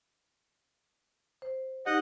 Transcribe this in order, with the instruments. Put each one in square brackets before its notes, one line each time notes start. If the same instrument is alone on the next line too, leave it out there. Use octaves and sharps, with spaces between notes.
[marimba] C5
[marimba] D#4 G4 [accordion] D#5 F#5